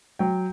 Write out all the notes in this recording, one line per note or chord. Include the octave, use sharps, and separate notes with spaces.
F#3 G5